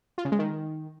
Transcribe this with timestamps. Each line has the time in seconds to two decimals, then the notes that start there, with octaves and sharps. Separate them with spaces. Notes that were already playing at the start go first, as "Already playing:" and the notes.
0.18 F4
0.25 C#3
0.32 G#3
0.39 D#3